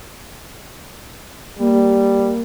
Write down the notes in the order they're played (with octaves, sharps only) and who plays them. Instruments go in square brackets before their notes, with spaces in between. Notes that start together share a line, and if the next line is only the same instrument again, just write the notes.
[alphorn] G3 [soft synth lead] A#3